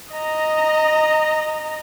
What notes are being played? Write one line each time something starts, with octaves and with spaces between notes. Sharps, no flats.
D#5 A#5